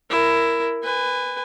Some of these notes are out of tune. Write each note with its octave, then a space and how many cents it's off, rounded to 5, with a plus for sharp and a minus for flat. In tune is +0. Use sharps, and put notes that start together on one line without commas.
E4 +10 A#4 +0
B4 +15 G#5 -30